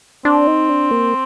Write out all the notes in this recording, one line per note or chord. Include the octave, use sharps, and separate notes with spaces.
C4 D4
D#4
D4
A#3